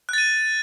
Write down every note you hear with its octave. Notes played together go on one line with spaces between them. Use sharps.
F#6 A6 D#7